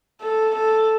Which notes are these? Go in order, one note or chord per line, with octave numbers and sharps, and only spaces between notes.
A4
A4